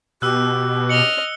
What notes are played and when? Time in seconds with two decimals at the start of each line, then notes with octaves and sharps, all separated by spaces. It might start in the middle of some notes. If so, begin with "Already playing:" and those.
0.22 B2 G4 E6 F#6
0.89 D#5 F6 C#7 F#7 G7